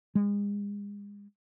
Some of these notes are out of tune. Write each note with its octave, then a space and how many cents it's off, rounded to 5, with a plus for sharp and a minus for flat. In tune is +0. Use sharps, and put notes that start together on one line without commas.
G#3 -35